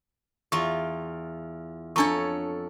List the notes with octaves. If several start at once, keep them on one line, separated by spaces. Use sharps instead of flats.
E2 F4 C#6
F2 D4 A4 C#5 A#5 C#6